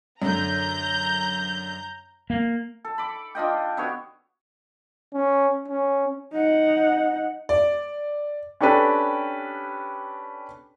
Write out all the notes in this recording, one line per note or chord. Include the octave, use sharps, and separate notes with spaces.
F#2 D3 A#5 G6
A#3
A4
B5 D6
D4 F4 D#5 G5
D3 B3 F#4 C#5
C#4
C#4
D#4 F#5
D5
C#4 D4 G4 A4 B4